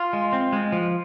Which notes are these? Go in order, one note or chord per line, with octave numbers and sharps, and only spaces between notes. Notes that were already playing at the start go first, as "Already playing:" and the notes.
Already playing: F4
G#3
C4
G#3
F3